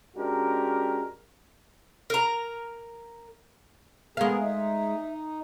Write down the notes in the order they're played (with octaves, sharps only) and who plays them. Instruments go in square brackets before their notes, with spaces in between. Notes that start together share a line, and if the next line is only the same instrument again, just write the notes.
[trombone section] G#3 C#4 D4 F#4 G4 A#4
[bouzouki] A#4 A#5
[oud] G#3 F5 [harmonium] B3 G#4 A#4
[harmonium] D#4 [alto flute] E5